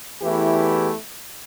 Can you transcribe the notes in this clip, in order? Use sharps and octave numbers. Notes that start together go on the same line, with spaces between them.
E2 E3 A3 E4 G4